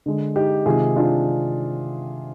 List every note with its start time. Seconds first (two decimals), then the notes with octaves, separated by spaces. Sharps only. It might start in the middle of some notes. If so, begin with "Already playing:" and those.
0.06 D3 G#3
0.36 D#4 G4
0.66 C3 D#3 G#3 F4 G#4
0.96 D4 F4